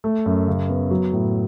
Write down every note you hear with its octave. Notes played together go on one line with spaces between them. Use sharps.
A3
F#2
C#3
B3
F#3
A2